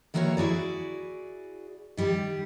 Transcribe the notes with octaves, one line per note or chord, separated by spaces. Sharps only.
D#3 E3 A#3 F#4 A#4 C#5
E4 F#4 G#4 D5
D#3 G3 G4